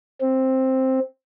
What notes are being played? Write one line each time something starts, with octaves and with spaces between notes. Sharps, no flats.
C4